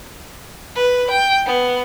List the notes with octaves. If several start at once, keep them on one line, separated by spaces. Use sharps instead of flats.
B4
G5
B3